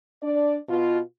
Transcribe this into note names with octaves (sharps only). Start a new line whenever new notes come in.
D4 D5
B2 F4